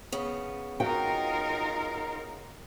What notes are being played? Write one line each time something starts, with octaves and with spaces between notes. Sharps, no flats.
C#3 B3
D#4 F4 F#4 A#4 G5